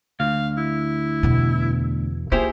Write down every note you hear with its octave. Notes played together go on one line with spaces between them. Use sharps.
D2 F5
E4
E2 B2
A#3 E4 F4 G4 G#4 C5